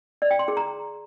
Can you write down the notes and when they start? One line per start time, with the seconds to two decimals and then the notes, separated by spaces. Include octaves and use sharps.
0.22 D5
0.31 G5
0.39 C6
0.48 G#4
0.57 A#5